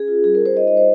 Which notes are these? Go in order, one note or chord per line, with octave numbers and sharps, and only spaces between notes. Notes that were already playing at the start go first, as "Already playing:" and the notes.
Already playing: C#4 G#4
F4
G3 G#4
A#4
F4 C5
D#4 D#5
D#5
G3
C5